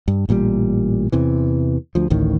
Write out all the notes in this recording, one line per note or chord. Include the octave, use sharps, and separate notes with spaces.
G2
A1 A#2 F#3 G3
E2 C3 E3
D2 F3
A1 D2 A2 D#3